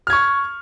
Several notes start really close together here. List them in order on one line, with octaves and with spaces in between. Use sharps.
F6 G#6 C#6